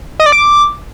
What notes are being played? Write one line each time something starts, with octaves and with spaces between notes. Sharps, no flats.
D#5
D5
D6